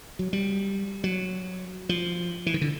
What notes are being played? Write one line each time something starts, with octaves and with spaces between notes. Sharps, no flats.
F#3
G3
F#3
F3
E3
D#3
D3